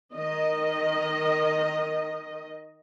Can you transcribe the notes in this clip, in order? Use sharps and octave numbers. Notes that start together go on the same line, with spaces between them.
D#3 D#5